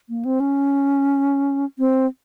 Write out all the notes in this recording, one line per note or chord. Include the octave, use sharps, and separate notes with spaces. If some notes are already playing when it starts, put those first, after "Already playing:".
A#3
C4
C#4
C4